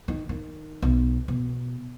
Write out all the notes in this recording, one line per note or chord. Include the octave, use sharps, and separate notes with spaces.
D#3
D#3
B1
B2